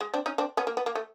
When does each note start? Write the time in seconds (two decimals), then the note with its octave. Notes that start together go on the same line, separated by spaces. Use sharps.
0.01 G#3
0.14 C4 D4
0.26 C#4 D#4
0.38 C4 D4
0.57 B3 C#4
0.67 A#3
0.77 B3
0.86 A#3
0.95 A3